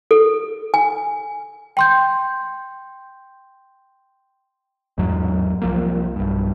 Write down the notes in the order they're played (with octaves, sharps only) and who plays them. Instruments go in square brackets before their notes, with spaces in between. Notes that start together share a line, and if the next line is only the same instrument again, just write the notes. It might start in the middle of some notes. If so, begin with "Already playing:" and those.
[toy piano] A4
G#5
[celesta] G5 C6 G6
[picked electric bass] A1 E2 G#2 F#3
C2 F3 A#3
B1 G2